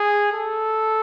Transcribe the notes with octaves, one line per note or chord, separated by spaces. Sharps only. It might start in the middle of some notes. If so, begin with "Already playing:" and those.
Already playing: G#4
A4